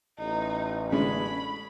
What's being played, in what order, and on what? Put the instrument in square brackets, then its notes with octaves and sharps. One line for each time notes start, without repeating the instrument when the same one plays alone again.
[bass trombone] A1 [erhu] D#4
[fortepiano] D3 G#3 C#4 [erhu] B5